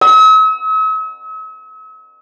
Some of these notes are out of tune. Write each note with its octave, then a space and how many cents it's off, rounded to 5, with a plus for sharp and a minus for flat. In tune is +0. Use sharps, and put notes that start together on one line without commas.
E6 -45